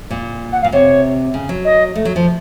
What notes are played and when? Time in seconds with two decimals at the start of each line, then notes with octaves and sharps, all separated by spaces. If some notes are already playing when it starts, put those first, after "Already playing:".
0.10 A#2
0.52 F#5
0.62 F5
0.64 A#2
0.72 C3 C#5
1.34 C#3
1.49 F#3
1.65 D#5
1.95 A3
2.05 F#3
2.16 F3